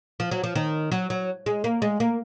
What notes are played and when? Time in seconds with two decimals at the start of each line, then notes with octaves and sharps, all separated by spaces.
0.20 F3
0.31 F#3
0.44 F3
0.55 D#3
0.92 F#3
1.10 F#3
1.46 G#3
1.64 A#3
1.82 G#3
2.00 A#3